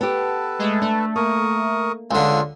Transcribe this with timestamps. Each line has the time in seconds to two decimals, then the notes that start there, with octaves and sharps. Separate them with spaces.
0.01 B3 G4 A4 B4 A5
0.59 G#3 A3
0.82 A3 D4
1.16 A#3 A#4 C#6 D#6
2.11 C#2 D3 F4